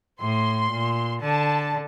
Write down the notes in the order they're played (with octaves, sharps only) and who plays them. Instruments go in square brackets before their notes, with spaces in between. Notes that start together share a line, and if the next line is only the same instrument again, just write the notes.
[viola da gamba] A2 [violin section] C6
[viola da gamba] A#2
[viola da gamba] D3 [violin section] A5